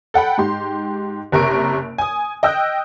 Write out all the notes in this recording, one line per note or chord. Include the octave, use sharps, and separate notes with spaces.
A4 F#5 G5 B5
G#2 G4 C6
F#1 C3 A#4 C#6 D7
G#5 D#6
D#5 G5 E6 F#6 G6